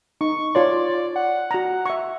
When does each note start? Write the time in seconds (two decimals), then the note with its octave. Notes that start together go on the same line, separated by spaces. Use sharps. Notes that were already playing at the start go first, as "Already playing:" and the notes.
0.21 D#4 C#6
0.55 F4 C#5 D5 C6
1.16 F#5
1.51 F#4 A#5
1.86 E5 C#6